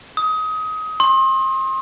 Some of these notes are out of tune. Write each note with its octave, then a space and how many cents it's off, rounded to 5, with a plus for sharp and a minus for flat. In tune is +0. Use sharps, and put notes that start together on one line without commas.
D#6 +25
C6 +30